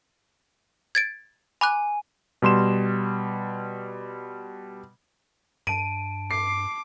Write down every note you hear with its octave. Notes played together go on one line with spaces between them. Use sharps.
G#6 A6 D7
G#5 B5 D6 F#6
B2 G3 C6 E7
G2 A5 D7 D#7
D6 C7